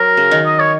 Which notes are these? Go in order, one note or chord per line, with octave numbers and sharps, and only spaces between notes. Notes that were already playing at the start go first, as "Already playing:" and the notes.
Already playing: F#3 A#4
C#3
D#3
D#5
C#5